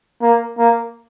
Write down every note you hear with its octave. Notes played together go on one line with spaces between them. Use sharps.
A#3
A#3